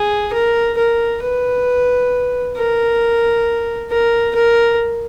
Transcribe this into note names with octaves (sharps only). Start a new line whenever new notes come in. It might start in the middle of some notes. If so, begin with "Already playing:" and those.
Already playing: G#4
A#4
A#4
B4
A#4
A#4
A#4